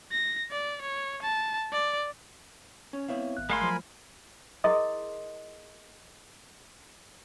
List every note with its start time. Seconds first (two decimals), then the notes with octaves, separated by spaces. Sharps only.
0.12 A#6
0.51 D5
0.82 C#5
1.23 A5
1.73 D5
2.93 C#4
3.08 B3 C4 E4 C#5 E5 F5
3.37 G#1 F#6
3.50 G#3 A3 A#4 F5 G#5 B5 C6
3.62 F3 F#3
4.64 E4 G#4 A#4 D#5 C6 D#6